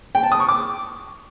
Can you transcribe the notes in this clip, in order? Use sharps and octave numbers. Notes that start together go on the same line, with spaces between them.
G5
A5
D#6
C#6
D6